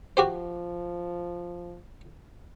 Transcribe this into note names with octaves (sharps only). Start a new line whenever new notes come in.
F3 F#4 G4 C5